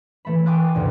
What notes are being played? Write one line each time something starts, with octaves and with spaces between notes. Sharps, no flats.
E3 A3 B5
G5 G#5 C6 D6 D#6 F#6
D2 G2 B2